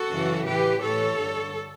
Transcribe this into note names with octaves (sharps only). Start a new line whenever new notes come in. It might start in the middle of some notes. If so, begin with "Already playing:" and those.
Already playing: F#4 A4
F#2 C#3 E3
A2 E3 G4 B4
A2 E3 A4 C#5
G2 D3